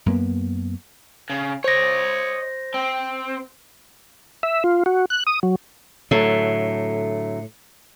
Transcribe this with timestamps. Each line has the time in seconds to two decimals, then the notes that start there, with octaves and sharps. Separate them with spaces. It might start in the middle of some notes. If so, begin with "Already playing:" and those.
0.06 F#2 A#3 B3
1.30 C#3
1.64 C5 C#5 D#5 A#6
2.74 C4
4.43 E5
4.64 F4
4.86 F#4
5.10 F#6
5.27 D#6
5.43 F#3
6.11 A2 D3 F#3 A3